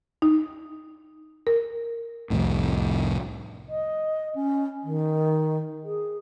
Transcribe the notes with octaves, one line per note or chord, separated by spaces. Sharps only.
D#4
A#4
C2 F2 A2
D#5
C#4
D#3
G#4